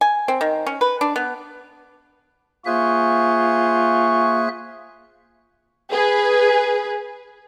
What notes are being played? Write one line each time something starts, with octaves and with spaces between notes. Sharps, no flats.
G#5
C4
D#3
C#4
B4
D4
B3
A#3 F4 G#4 C5 E5 G#5 C#6 F#6
G#4 B4